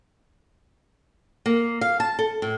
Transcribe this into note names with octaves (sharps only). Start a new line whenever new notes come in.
A#3
F5
A5
A4
A2